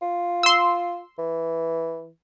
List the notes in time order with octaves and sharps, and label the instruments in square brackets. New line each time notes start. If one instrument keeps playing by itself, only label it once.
[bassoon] F4
[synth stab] C6 E6
[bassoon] E3